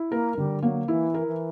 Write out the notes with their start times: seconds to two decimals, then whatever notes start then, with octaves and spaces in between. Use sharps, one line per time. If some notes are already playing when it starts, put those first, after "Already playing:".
Already playing: E4
0.11 A#3 A#4
0.37 D3 G3
0.63 F#3 A#3
0.88 E3 E4
1.14 A#4
1.27 E3